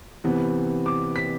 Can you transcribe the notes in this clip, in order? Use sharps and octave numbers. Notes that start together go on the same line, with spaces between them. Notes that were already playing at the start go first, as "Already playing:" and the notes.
C3 E3 B3
D6
B6